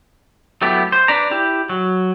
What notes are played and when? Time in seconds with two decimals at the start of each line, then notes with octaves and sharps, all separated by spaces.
0.62 F#3 A3 B3 E4 G4
0.92 C5
1.08 D4 B4 D5 A#5
1.31 E4 G4
1.69 F#3